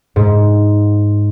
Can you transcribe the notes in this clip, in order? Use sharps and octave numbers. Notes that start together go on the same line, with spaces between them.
G#2